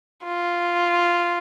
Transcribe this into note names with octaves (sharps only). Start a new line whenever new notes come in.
F4